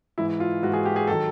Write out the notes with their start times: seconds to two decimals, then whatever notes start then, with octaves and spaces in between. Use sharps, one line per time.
0.18 G#2 E3 E4
0.40 F4
0.63 G#2 E3 F#4
0.73 G#4
0.86 G4
0.96 G#4
1.07 D#3 F#3 A4